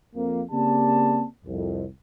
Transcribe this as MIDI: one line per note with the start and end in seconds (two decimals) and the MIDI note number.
0.15 0.41 41
0.15 0.41 58
0.52 1.24 49
0.52 1.24 58
0.52 1.24 60
0.52 1.24 67
0.52 1.24 74
0.52 1.24 81
1.45 1.84 36
1.45 1.84 41